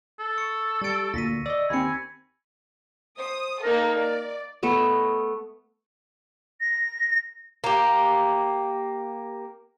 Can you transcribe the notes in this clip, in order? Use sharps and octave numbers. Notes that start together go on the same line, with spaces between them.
A4
C#6 E6 C#7
G3 A6 C#7 D7
D2 A#2 A#6 B6 D#7
D5 D#5 E6
D#2 C4 G#5 B5 C#7
C5 D#6
A#3 D#4 A4 A#4
D5
A3 B3 D#5
A#6
A#3 G4